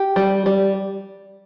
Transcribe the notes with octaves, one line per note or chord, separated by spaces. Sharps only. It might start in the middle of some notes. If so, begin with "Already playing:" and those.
Already playing: G4
G3
G3